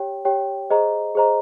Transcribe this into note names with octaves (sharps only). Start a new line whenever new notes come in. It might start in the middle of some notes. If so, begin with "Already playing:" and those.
Already playing: G4 C#5 G5
G4 C#5 G5
G#4 C5 D#5 A#5
G#4 C5 D#5 A#5